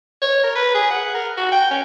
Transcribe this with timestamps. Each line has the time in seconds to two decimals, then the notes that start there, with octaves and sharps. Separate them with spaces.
0.22 C#5
0.44 A#4
0.55 B4
0.74 G#4
0.90 F#5
1.14 A#4
1.37 F#4
1.52 G5
1.70 C#4